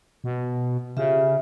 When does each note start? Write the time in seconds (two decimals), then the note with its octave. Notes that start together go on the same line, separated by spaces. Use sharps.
0.24 B2
0.97 C#3 F4 G4 E5